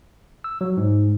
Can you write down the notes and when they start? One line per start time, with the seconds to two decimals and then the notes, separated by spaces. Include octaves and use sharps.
0.44 E6
0.61 F#3
0.77 G#2